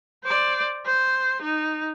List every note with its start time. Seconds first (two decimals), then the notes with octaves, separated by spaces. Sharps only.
0.24 C5 D5
0.86 C5
1.42 D#4